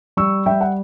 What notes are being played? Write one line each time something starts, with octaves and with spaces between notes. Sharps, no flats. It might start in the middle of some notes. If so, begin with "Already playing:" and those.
G3 C#6 E6
G3 E5 G5
F#5